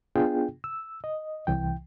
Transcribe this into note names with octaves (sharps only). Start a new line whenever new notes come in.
B3 D4 F4 G#4 G5
E6
D#5
C2 E3 G5